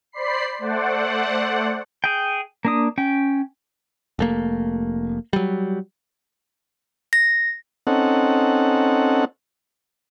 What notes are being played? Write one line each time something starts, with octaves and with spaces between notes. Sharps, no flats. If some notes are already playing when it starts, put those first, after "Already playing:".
C5 D5 B5 C7
A3 C5 D5 F#5
G#4 G5
A#3 D4 D#6
C#4 G5
F1 A3 A#3
F#3 G3
A#6
C4 C#4 D#4 A4 F#5